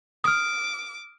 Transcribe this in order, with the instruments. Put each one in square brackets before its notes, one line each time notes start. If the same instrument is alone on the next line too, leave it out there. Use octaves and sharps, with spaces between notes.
[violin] D6 [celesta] D#6 F6